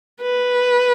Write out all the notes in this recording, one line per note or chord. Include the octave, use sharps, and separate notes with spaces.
B4